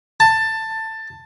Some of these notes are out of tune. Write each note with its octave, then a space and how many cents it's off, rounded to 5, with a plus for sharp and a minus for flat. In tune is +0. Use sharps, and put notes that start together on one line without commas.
A5 +15